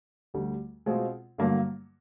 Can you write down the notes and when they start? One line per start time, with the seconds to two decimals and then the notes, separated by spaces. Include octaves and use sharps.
0.34 D2 D3 G3
0.86 B2 G#3 C4 F4
1.38 G2 D3 F#3 A#3